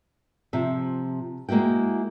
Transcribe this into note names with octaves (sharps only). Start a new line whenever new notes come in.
C3 F3 E5
G#3 A#3 E4 F#4 G5